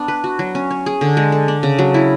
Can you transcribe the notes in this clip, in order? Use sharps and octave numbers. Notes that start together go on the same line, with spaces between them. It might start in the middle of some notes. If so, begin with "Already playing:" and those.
Already playing: B3 D4
B4
F#4
F#3
C#4
C#5
G#4
D3
G#3
A4
D4
C#3
F#3
E4